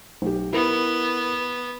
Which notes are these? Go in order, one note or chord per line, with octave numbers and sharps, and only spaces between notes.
B1 G4
B3 E4 A#4